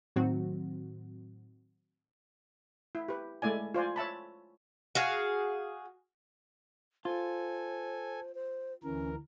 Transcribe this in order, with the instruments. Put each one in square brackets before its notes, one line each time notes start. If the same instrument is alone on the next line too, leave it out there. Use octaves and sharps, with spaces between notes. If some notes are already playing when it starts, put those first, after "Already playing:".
[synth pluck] A2 D#3 F#3 C4 F#4
[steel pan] E4
G4 B4
G#3 A3 E4 D5 G#5
F4 C5 D5 G#5
C#5 E5 A5 B5
[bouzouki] F#4 G#4 F5
[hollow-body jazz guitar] F4 [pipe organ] A4 G#5 [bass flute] C5
[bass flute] C5
[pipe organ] D2 E3 A#4 [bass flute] C#4